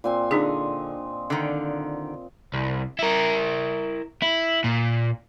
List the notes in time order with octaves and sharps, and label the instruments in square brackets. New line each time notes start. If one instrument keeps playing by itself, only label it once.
[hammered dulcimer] A#2 C4 G#5
[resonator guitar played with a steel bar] D3 [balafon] D4 D#4 G#4 [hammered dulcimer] D#5
[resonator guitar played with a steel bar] D3 D#3
[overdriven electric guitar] C2
E4 A#4
E4
A#2